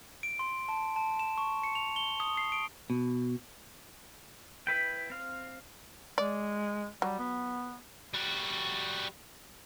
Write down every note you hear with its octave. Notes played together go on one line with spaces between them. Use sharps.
D7
C6
A5
A5
E7
C#6
C#7
F7
G7
D#6
C7
D7
B2
E4 B4 G5
C4 F5
G#3 D5
F#3 G3
B3
G3 F#4